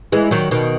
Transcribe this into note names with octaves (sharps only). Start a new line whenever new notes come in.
E3 G#3
D#3 F#3
B2 D#3